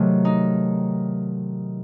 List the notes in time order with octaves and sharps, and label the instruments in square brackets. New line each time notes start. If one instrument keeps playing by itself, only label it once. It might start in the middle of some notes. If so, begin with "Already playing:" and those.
Already playing: [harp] C3 D#3 F#3 A3
D#4